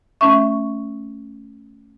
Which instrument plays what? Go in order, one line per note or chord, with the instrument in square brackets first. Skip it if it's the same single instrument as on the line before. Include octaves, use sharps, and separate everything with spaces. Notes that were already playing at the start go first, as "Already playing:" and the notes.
[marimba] A3 C#4 E5 [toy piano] C#6